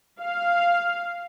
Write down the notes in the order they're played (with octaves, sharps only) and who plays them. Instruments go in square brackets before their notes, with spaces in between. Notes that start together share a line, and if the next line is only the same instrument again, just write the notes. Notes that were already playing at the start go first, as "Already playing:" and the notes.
[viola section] F5